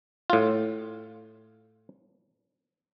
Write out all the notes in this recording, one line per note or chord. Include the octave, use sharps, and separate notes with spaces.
A2 F4